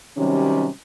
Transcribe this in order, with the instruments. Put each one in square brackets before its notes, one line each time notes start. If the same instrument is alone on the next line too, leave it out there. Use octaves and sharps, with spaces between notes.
[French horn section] C3 D#3 F#3 G3 C#4